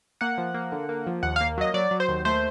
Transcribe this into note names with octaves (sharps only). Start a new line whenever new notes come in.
A#3 F#5
F3
A#3
D3
A#3
F3
D#2 F#5
A#3 F5
F#3 D#5
F#3 D5
F#3
C5
D#2
A3 C5